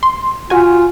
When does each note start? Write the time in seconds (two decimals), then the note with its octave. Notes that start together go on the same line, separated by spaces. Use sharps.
0.03 C6
0.50 F4 F#4 G#5